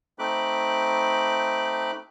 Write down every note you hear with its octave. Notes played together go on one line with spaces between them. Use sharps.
A3 C4 D#4 B5 D6 F#6